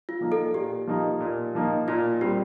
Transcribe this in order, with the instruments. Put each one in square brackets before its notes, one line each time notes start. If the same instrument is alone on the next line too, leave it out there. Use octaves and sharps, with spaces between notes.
[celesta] F4
[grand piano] F3 A#3 D#4
[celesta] A4
[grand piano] A#2 [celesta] G4
[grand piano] F3 A#3 D#4
A#2
F3 A#3 D#4
[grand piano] A#2 [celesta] F4
[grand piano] G3 C4 [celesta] G4